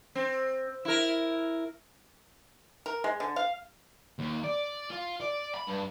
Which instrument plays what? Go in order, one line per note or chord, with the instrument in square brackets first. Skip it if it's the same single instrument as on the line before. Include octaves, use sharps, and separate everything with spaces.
[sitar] C4
E4 A#4
[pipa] A#4
G#3
D3
F5
[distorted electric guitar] D#2
D5
F4
D5
B5
G2